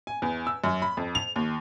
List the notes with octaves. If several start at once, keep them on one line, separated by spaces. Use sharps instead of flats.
G#5
E2
E6
F#2
B5
F2
F7
D#2